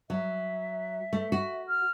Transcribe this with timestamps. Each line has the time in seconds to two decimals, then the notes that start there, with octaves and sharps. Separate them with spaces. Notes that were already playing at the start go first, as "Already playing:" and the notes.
0.10 F#3 E5
1.13 A3
1.32 F#4
1.68 F6